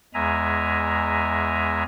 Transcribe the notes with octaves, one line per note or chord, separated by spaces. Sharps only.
E2 G#3 E5 G#5 A#5